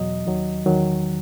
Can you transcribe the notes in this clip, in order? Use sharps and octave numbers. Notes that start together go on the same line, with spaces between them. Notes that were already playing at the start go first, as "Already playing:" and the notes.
Already playing: E2 B2 F#3 D#5
D#2 D#3 F#3
E2 D#3 F#3